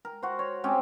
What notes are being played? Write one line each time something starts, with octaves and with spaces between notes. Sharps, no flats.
A#4
F#4 C5
C#5
G#3 C4 C#4 G4